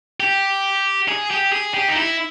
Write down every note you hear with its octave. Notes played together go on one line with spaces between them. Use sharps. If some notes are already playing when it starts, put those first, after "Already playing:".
G4
G#4
G4
G#4
G4
D#4
E4